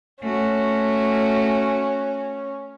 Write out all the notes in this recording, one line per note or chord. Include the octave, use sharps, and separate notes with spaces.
A3 C#4 F#4